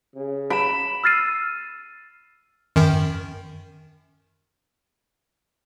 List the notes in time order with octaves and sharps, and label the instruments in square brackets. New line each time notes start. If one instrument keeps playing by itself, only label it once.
[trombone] C#3
[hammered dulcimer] B5 [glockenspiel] D7 E7
[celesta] E6 F6 A6 C7 D#7
[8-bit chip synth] F#2 D#3